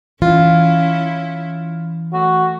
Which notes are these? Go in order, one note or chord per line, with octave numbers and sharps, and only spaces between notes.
E3 C#4 E4 F4
A3 F#4